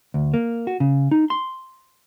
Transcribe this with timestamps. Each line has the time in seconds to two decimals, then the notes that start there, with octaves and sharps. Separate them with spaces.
0.14 D2
0.34 A#3
0.67 F#4
0.80 C#3
1.11 D#4
1.30 C6